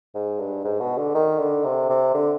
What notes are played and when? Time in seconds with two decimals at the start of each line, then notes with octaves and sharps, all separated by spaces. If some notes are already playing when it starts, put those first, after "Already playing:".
0.14 G#2
0.39 G2
0.64 G#2
0.81 B2
0.98 D3
1.14 D#3
1.39 D3
1.64 C3
1.89 C3
2.14 D3